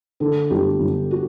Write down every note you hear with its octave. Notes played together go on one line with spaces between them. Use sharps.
D3 A4
G1 G4
G1
F#4